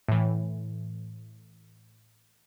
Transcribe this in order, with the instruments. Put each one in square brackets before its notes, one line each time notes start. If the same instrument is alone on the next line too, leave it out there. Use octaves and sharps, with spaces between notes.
[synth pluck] A2 E3